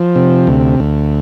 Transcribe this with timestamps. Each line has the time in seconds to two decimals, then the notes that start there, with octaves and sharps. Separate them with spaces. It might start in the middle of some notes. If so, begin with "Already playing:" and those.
Already playing: F3
0.16 C3
0.47 D2
0.80 D2